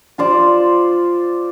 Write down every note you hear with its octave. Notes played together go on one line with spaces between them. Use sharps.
F4 C5 D5